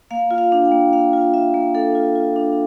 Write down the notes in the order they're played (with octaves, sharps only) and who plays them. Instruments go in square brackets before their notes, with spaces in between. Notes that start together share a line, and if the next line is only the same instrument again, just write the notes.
[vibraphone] A#3 F5
F4
F5
D4
G5
A#3
A#3 F5
F4
F4 E5
A#3
D4 A4
F4
F4
D4